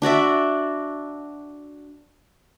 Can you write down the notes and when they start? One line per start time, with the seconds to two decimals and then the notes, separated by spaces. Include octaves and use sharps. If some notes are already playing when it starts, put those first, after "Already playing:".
0.02 D4 F#4 D5 E5